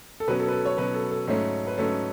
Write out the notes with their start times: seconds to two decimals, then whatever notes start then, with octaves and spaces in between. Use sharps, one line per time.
0.20 A4
0.28 B2 F#3 C#4 B4
0.40 A4
0.48 B4
0.53 A4
0.65 C#5
0.78 B2 F#3 C#4 B4
0.94 A4
1.11 A4
1.27 G#2 F#3 A3 C#4
1.67 B4
1.78 G#2 F#3 A3 C#4 A4